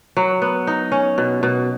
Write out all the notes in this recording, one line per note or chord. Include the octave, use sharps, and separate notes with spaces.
F#3
B3
D#4
C#4
B2
B2